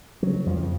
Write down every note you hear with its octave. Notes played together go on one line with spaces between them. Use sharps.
C#3 F#3
F2 F3